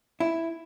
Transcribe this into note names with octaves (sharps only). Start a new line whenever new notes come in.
E4